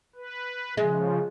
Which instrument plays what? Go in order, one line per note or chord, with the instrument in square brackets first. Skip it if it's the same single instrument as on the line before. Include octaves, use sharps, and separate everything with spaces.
[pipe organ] B4
[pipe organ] C#3 F3 [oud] G#3